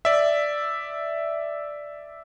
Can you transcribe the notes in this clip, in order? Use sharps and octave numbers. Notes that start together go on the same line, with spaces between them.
D5 E5